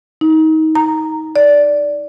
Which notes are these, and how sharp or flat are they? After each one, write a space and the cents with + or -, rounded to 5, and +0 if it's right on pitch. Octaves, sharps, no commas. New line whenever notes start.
D#4 +25
A#5 -5
D5 -10